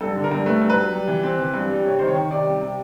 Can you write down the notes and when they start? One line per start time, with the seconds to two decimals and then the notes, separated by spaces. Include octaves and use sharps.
0.01 G2 A4
0.16 D3
0.24 A#4
0.31 G2
0.46 A3 B4
0.62 G2
0.70 B4
0.78 F#3
0.92 G3
1.08 E3
1.23 C4
1.39 E3
1.54 G2
1.69 G3
1.85 C3 C#5
1.99 D#3 C5
2.07 C#5
2.15 D#3
2.31 C3 D5
2.46 G3
2.61 C3